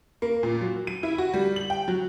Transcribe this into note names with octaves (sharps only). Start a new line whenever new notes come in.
A#3
A#2
F#3
D#7
E4
F#4
G3
F#7
G5
F#3